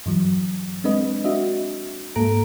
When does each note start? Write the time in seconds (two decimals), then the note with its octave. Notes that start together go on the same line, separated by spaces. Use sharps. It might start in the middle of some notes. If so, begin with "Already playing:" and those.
0.06 G2 E3 F#3
0.84 G#3 C4 D4 B4 D#5
1.24 D4 F#4 D#5 E5
2.16 G#2 A#3 A4 A#5 D7